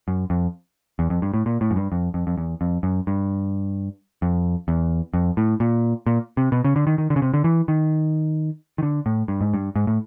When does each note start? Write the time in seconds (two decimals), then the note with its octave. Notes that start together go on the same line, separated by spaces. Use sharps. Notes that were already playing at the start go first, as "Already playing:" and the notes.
0.08 F#2
0.30 F2
0.99 E2
1.10 F2
1.22 G2
1.34 A2
1.46 A#2
1.61 A2
1.71 F#2
1.76 G2
1.92 F2
2.14 F2
2.27 F2
2.38 E2
2.61 F2
2.83 F#2
3.07 G2
4.22 F2
4.68 E2
5.14 F2
5.37 A2
5.60 A#2
6.06 A#2
6.37 C3
6.52 B2
6.65 C#3
6.76 D3
6.87 D#3
6.98 D#3
7.10 D3
7.16 C#3
7.22 C3
7.34 D3
7.44 E3
7.68 D#3
8.78 D#3
8.83 D3
9.06 A2
9.28 G2
9.41 G#2
9.54 G2
9.76 G#2
9.87 A2